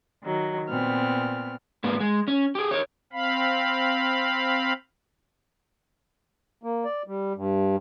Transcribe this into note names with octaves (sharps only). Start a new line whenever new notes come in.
D#3 F#3
A#2 B3 C4 F6
G#2 A#3 B3
G#3
C#4
G4 G#4
A#4 C#5
C4 F5 B5
A#3
D5
G3
G2